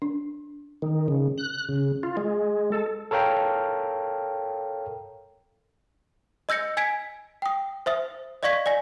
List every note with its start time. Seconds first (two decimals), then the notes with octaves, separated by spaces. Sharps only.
0.02 D4
0.82 D#3
1.08 C#3
1.38 F#6
1.69 C#3
2.03 F4
2.17 G#3
2.72 A4
3.11 A4 A#4 C#5 F5 G5 A#5
6.49 D#5 E6 G6 A#6 C#7
6.77 G#5 G#6 B6 D7
7.42 G5 D#6
7.86 C5 E5 D#6
8.43 D5 D#5 F5 C#6 G#6 B6
8.66 D5 G#5 A#6